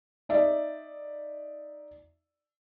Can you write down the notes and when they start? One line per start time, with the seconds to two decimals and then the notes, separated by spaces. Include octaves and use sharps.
0.29 D#4 D5 E5